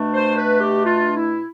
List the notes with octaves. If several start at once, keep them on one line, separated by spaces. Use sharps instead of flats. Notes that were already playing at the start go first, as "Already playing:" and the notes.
Already playing: B2 A3 D4
C5
B4
G4
F4
E4